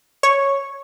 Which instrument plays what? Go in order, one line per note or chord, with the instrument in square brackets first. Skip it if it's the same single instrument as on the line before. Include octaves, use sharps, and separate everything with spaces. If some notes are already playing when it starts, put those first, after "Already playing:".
[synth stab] C#5